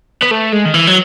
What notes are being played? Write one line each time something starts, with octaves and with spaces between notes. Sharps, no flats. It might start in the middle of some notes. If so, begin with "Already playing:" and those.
B3
A3
G#3
D#3
E3
F#3